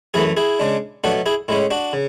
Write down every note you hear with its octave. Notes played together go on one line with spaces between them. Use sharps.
F#2 E3 A3 E4 G#4
E4 G#4
C#3 G#3 D4
B2 F#3 A3 D4 F#4
E4 G#4
A2 G#3 C#4 E4
D4 F#4
C#3